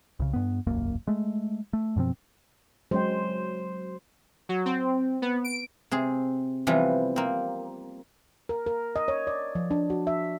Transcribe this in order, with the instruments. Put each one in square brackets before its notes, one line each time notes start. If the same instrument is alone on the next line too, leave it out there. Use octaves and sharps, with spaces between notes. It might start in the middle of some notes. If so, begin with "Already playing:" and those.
[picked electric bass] C2 C#3
G2 B3
E1 C2 F#2 A#3
G#3 A3
A3
F#2 B2 F3 C4
[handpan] F#3 C5 [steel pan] G#3 C#4 G5
[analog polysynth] F#3
C4
B3
D7
[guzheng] C3 C4 G#4
C3 E3 F3 G3 B3 F4
A#3 C4
[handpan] A#4
A#4
D#5
C#5
D5
F3
D4
F#4
E5